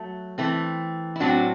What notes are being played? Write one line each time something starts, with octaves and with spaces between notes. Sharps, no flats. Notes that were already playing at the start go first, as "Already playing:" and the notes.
Already playing: F#3 A3
E3 A3 C4
E4
A2 F#3 C4 D4 F#4